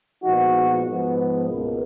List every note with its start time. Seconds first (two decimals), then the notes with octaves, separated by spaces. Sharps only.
0.23 A#2 F3 G#3 B3 D#4 F#4
0.87 G#2 F3 B3
1.48 C#2 B2 A#3